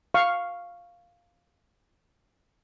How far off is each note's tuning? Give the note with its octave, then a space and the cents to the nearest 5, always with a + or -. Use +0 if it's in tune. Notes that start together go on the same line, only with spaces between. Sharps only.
F5 +0 C#6 +0